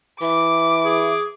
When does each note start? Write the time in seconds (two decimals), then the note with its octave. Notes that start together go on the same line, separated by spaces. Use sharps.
0.21 E3 E5 D6
0.85 G#4